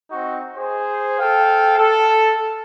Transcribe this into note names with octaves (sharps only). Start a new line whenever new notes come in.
C4 D#4 F#4
G#4 C5
A4 F5 G5
A4